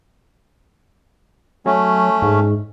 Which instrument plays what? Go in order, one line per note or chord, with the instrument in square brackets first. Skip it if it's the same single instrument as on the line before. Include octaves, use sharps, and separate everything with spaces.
[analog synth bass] F#3 [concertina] A3 C#4
[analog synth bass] G#2